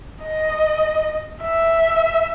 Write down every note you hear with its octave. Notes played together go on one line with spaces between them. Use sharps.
D#5
E5